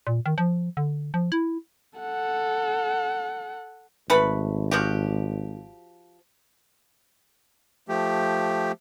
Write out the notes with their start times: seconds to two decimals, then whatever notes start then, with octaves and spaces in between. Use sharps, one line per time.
0.07 A#2
0.26 D#3
0.38 F3
0.77 D3
1.14 F3
1.32 E4
1.99 A4 F#5
4.10 G#1 A3 B4 B5
4.71 F3 F#4 G4
7.89 F3 A3 G4